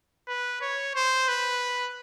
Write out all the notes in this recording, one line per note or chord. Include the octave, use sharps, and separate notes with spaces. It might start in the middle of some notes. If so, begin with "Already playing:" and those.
B4
C#5
C5
B4